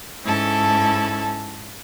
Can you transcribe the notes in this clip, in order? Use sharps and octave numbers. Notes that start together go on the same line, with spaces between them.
G#2 C#4 E4 A4 A5